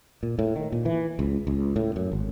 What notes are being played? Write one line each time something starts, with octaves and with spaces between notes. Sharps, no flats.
A#2
A2
D#3
A#2
E3
C#2
C#2
A2
F#2
G#1